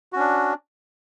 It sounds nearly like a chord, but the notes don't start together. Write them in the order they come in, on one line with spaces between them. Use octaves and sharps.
F#4 C#4 D4